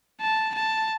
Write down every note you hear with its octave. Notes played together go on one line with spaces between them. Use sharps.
A5
A5